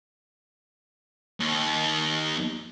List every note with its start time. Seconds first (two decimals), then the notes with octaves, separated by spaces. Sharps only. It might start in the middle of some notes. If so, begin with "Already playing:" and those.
1.40 D#2